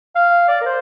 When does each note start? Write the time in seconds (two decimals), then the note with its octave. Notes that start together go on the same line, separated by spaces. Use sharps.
0.15 F5
0.48 D5
0.61 A#4
0.65 C5